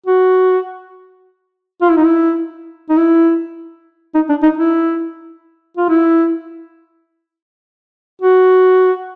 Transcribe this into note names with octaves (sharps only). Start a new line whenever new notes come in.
F#4
F4
E4
D#4
E4
D#4
E4
D#4
D4
D#4
E4
F4
E4
F#4